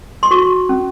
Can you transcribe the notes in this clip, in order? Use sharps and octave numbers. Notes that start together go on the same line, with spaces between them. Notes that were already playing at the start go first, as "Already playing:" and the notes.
C6
F#4 C#6
C#4